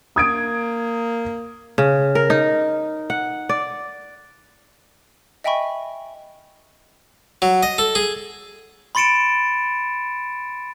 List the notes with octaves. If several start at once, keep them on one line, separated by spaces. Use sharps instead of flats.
A#3 D#6 G#6 D7
C#3
A#4
D#4
F#5
D5
D#5 E5 G5 G#5 B5 C#6
F#3
D#5
A4
G#4
B5 C6 A6 C#7 D7 E7